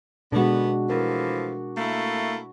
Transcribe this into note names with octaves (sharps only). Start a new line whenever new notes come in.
B2 D3 G#3 B3 D4 F#4
E3 F3 A3 A#4
A3 A#3 E4